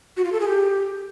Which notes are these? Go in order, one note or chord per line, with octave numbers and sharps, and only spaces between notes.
F#4
F4
A4
G#4
G4